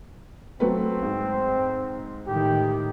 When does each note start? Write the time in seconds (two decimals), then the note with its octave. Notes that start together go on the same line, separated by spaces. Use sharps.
0.60 F#3 A3 C4 B4
1.03 G#2
2.27 A2 D#3 G4